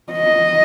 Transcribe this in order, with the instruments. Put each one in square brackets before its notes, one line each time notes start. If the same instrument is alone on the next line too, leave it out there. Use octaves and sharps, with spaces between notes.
[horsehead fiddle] D#5